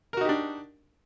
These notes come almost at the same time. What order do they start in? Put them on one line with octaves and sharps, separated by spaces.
A#4 F#4 D#4 G4 D4